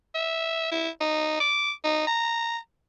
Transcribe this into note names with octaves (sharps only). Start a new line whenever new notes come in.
E5
E4
D#4
D6
D#4
A#5